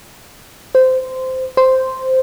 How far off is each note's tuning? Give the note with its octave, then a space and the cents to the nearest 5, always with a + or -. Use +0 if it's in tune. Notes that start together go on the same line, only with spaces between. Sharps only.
C5 -15
C5 -5